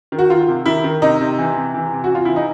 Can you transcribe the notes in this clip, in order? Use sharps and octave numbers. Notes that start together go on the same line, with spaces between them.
D#3
F#4
D#3 F4
C3
D#3 E4
D#3
C3 D#4
C3
E3
C3
E3
C3
F#4
C3 F4
E3 E4
D#4